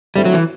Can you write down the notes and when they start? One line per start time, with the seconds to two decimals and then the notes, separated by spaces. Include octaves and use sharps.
0.16 D3 G3 A3 C4 E4
0.25 F#3
0.34 E3